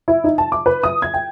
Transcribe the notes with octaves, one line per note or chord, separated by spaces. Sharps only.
E4
D#4
A5
D6
B4
D#6
G#6
G5